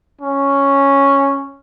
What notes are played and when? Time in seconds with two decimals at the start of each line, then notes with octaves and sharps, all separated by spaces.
0.21 C#4